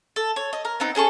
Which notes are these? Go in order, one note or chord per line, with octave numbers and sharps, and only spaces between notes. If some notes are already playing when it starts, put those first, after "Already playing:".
A4
C#5
D#5
A#4
B3 C4 D#4
C#4 G#4 A4 C#6